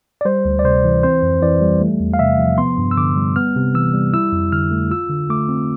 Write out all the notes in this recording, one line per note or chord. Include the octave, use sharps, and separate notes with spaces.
D5
G3 C5
D2
D5
C3 C5
E3
C4 C5
F2
E3 D5
G3
A3
E2
F5
C3 E5
F3
B3 C6
G2
E6
D3 D6
G3
B3 F6
C3
E3 E6
G3
E4 E6
F2
D3 F6
A3
F4 E6
D3
A3 D6
C4